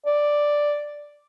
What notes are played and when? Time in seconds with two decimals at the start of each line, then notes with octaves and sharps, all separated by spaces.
0.06 D5